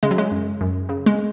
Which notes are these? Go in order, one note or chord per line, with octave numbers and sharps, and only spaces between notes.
C#3 G#3
F#3
G#3
F#2
F#2
C#3
G#3